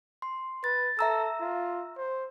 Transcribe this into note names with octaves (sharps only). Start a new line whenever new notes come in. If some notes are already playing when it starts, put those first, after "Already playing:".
C6
B4 A6
A4 E5 A#5 E6
F4
C5